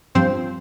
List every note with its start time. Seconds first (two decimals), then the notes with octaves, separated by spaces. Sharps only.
0.15 G2 F3 C4 C5